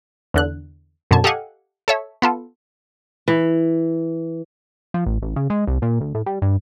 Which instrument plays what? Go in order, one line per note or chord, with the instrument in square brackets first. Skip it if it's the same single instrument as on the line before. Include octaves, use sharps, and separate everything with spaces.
[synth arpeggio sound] E2 D3 F#6
F#2 B2 D3 A5 G#6
G4 A4 D#5 F5 F#5 G#5
A4 C#5 E5
B3 F4 A4
[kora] E3
[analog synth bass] F3
A1
A1
C#3
G#3
C2
A#2
D2
A2
G3
G2